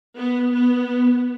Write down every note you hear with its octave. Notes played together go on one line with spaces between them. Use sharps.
B3
B3